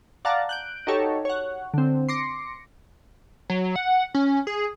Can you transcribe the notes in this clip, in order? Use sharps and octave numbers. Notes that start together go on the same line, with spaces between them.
D5 F5 F#5 A5 A#5 A6
F#6 G6 D7
D#4 F#4 G4 A4 C#5
C#5 F#5
D3 C4
C6 D6 A#6 C#7
F#3
F#5
C#4
G#4